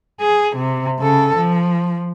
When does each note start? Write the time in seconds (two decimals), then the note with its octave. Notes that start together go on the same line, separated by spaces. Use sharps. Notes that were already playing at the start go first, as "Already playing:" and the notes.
0.20 G#4
0.56 C3
0.99 C#3 A4
1.36 F3